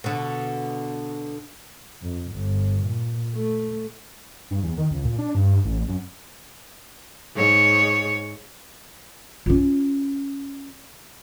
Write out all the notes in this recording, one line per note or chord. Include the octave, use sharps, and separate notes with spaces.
B2 D3
F2
G1
A#2
A3
G2
E2
D#3
C#2
A#2
D4
G2
A1
F#2
G#2 C#5
C#4 F4